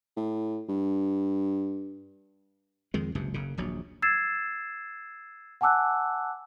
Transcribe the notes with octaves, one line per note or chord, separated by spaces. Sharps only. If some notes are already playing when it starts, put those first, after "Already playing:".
A2
G2
F2 D#3 G#3
F#1 C#2 G2 C3
F#1 F#2 C#3
D#1 A#1 F#3
E6 G#6 A6 C7 E7
F#5 G#5 A5 D6 E6 F#6